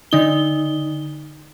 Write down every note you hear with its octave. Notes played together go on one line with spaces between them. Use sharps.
D3 D#4 G7